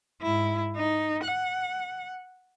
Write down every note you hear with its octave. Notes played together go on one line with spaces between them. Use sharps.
G#2 E4
D#4
F#5